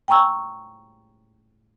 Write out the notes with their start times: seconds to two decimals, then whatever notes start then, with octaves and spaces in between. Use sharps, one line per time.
0.08 G5 G#5 A#5 C#6 E6